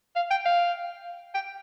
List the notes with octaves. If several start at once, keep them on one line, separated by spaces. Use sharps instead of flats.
F5
G5
F5
G5